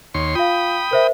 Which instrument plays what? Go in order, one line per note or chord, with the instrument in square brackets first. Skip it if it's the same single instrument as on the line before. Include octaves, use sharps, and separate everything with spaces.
[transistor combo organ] D#2 C#5 C6
[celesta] F4 F5 [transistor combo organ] G5 B5 D#6
[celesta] A#4 C5 E5